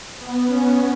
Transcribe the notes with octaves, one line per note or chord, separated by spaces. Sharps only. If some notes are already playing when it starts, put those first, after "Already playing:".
B3
C#4